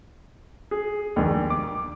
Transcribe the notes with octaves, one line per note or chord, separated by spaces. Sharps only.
G#4
A#1 D#2
D6